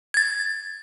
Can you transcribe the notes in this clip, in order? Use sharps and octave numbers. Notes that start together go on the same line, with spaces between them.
G#6 A6